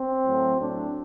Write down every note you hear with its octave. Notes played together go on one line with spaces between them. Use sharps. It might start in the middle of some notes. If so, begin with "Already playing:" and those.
Already playing: C4
A2 F#3 A3
A2 F#3 A3 D4